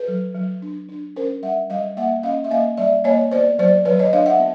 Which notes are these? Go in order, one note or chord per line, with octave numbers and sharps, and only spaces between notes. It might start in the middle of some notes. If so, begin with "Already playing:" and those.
Already playing: A4 B4
F#3
F#3
D4
D4
C#4 A#4 C5
G3 E5 F#5
G3 D#5 F5
A#3 E5 F#5
C#4 D#5 F5
E5
A#3 D#5 F5
G3 D5 E5
A#3 C#5 D#5
B3 C5 D5
F#3 C5 D5
F#3 B4 C#5
C#5 D#5
D4 D#5 F5
E5 F#5
B3